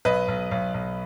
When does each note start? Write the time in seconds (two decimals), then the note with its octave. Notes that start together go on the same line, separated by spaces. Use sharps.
0.05 B1 B4 D#5
0.28 B1
0.51 B1
0.74 B1